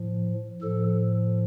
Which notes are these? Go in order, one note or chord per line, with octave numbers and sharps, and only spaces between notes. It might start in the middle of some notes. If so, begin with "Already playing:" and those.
Already playing: A2 F3
A2 F3 A4